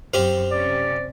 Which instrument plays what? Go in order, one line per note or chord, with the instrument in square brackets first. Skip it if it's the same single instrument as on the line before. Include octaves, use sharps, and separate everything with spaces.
[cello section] F#2 [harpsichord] C4 G4 F5 [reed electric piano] C5
[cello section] C3 C#4 [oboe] D5